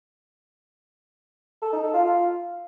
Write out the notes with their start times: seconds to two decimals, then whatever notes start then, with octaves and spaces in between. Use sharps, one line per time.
1.62 A4
1.73 D#4
1.83 A4
1.94 F4
2.04 F4